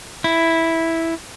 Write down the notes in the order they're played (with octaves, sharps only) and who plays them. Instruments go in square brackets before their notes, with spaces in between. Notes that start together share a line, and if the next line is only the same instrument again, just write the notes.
[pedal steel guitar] E4